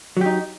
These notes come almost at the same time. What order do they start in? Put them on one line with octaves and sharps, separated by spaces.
F#3 G4 D#4